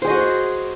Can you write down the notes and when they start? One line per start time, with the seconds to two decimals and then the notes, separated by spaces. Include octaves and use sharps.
0.02 C5
0.04 G#4
0.07 D#5
0.10 F#4